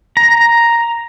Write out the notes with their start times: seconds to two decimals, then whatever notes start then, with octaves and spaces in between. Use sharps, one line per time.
0.17 A#5